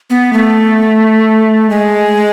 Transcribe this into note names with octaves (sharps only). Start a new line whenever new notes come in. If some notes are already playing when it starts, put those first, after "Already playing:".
B3
A3
G#3